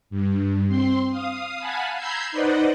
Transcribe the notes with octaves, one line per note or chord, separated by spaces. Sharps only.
G2
C4 C6
F5 D#6
F5 F#5 G#5 A5 B5
A#5 B5 E6 G6 G#6 C7
D#4 B4 C5 D5 D#5 F#5